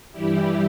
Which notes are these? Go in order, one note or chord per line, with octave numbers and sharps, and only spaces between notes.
G2 E3 G3 E4 G4